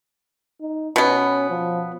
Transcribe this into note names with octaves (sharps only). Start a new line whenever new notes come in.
D#4
B2 B3 C#4
F3